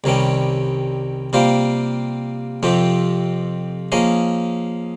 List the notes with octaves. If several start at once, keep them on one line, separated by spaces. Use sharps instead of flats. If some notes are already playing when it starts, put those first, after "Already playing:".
C2 C3 D#3 G3 C#4
C3 G3 A#3 F4 C5
F2 C3 F3 C4 G4
F3 A#3 C#4 G#4 D#5